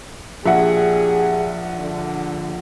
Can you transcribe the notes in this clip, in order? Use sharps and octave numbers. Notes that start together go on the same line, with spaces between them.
A#1 D4 G4 G#4 E5 F#5
D3